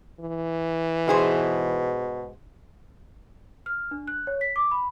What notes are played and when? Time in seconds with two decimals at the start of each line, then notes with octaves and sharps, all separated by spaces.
0.20 E3
1.08 G#2 B2 G#4 C5
3.66 F6
3.91 D4
4.08 F#6
4.27 C#5
4.41 B6
4.56 D6
4.71 B5